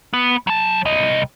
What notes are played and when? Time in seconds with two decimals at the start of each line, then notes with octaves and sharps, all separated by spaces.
0.13 B3
0.47 F#3 A5
0.85 C2 D#5